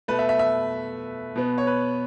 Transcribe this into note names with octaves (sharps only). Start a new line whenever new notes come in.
B2 A3 B4
E5
E5
E5
B2 B3
C#5
B4